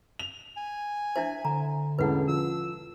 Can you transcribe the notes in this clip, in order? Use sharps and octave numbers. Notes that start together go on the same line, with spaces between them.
F7
G#5
D4 E4 C5 E5
D3 A#5
E1 A1 E4 A4 B4 F#5
F3 E6